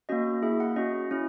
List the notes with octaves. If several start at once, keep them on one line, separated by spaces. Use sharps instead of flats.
A#3 C#4 F#4 D#5
A#3 E4 G#4 E5
F#5
C#4 F#4 D#5
C#4 E4